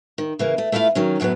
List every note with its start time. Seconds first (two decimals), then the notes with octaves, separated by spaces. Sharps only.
0.18 D#3
0.39 C#3 E3 A#3
0.58 A3
0.72 A3 E4 F4 E5 F5
0.95 D#3 F#3 C#4
1.20 F#2 A2 F3 F#3 B3